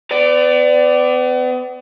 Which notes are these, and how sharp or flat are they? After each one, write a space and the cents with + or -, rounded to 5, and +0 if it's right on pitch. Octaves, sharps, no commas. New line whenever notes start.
B3 +40 D5 +0